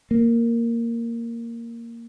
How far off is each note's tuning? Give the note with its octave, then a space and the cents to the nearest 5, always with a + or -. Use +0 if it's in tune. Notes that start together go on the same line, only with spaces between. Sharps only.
A#3 -5